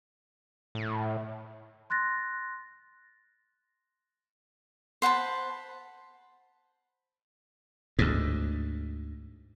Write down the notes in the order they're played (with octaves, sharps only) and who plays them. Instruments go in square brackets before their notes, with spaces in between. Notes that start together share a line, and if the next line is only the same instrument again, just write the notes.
[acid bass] A2
[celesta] C6 F#6 A6 A#6
[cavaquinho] C5 F#5 A5 B5
[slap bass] D2 G#2